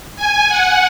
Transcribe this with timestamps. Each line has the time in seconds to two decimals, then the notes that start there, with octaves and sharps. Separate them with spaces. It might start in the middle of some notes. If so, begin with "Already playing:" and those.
0.16 G#5
0.48 F#5